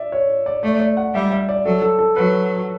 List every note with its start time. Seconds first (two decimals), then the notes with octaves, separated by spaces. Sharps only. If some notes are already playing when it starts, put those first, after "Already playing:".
Already playing: D5 E5
0.12 C#5
0.46 D5
0.63 A3 D5
0.80 D5
0.97 F#5
1.14 G3 E5
1.31 E5
1.49 D5
1.65 F#3 A4
1.82 A4
1.99 A4
2.16 F#3 B4